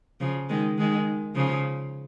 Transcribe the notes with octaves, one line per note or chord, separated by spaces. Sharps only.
C#3 F3
D#3 G#3
D#3 G#3
C#3 F3